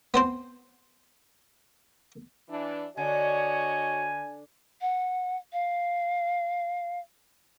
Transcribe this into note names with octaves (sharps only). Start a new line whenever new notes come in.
B3 C4 C5
E3 D4
D3 F#4 C#5 D#5 G#5
F#5
F5